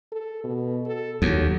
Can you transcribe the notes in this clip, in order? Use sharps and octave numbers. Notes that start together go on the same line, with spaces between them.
A4
B2
A4
D#2 F#3